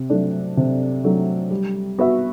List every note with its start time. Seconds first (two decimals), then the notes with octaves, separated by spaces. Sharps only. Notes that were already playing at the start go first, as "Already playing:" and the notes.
Already playing: C3
0.10 F#3 A3 D4
0.57 C3
1.04 F#3 A3 D4
1.51 G3
1.98 B3 F#4 B4 E5